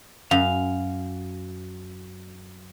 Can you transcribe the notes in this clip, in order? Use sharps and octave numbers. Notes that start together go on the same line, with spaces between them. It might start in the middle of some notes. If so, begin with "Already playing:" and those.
F#2 F5